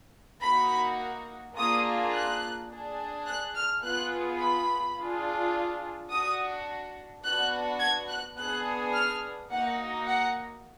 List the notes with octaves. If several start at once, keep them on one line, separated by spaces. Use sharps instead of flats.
A#3 D#4 F#4 B5
A#3 D4 F4 G#4 D#6
F#6
D4 G#4
F#6
F6
B3 F4 G#4 F#6
B5
D4 F4 G#4
D4 F#4 D#6
B3 D4 F#4 F#6
G#6
F#6
B3 D4 G#4 F#6
F6
A#3 D#4 F#4 F#5
F#5